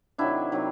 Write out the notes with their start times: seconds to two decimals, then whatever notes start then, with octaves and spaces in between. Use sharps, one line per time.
0.18 C3 D#3 F#3 D4 E4
0.52 C3 D#3 F#3